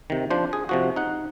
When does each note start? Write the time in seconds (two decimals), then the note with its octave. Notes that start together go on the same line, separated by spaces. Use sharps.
0.10 C3 D#3
0.30 F3 D4 C5
0.53 G#4
0.69 C3 F3 F#4
0.96 D#4 F#5